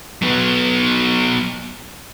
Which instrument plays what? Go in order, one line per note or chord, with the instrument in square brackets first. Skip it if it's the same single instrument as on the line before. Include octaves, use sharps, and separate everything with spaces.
[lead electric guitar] F#3 B3